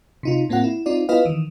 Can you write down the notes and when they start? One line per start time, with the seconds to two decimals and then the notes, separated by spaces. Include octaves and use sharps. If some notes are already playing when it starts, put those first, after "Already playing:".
0.23 C3 D#4 F4
0.49 A2 A#3 C4 F4 F#5
0.64 E4
0.86 C4 D#4 F4 D5
1.09 B3 E4 F4 B4 D#5 F5
1.25 D#3 E3